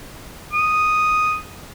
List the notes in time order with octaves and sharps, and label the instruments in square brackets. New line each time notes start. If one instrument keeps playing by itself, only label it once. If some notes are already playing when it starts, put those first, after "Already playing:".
[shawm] D#6